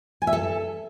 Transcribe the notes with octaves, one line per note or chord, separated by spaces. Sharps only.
G#5
E5
A4